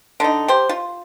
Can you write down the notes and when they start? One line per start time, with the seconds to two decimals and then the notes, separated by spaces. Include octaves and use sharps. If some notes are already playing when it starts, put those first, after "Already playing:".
0.20 D3 D#4
0.48 G4 C5
0.69 F4